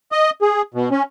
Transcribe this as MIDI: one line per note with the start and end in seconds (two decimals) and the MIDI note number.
0.12 0.30 75
0.42 0.62 68
0.74 0.89 47
0.91 1.03 61